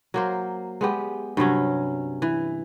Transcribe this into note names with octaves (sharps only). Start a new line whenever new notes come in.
F#3 A#3 C5
G#3 B3 G4
G2 C3 F#3 C#4
E3